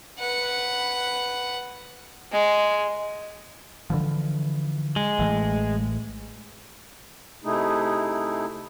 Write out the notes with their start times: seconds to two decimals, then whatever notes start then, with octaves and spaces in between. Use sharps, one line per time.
0.20 B4 F#5
2.32 G#3
3.90 D3 E3 F3
4.96 G#3
5.19 A1 E3 A3
7.44 C3 A3 D#4 E4 G#4